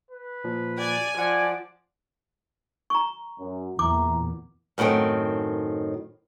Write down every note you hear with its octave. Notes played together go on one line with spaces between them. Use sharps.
B4
A#2 F3
D5 G#5
F3 D5 F#5 G#5
A#5 C#6
F#2
E2 A#2 E3 E5 A#5 D6
F#2 A2 D3 D#3 C4